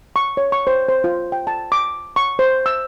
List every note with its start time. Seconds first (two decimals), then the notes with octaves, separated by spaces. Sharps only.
0.16 C#6
0.37 C#5
0.52 C#6
0.67 C5
0.89 C5
1.04 F4
1.32 G5
1.47 A5
1.72 D6
2.16 C#6
2.39 C5
2.66 E6